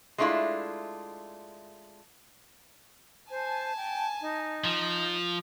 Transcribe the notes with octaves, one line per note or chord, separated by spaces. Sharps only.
G#3 A3 D4 E4 F4
C5 G#5 A5
G5
D#4
F3